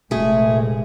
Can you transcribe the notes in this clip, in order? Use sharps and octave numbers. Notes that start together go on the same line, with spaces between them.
F1 A#2 G#3 A3 G#4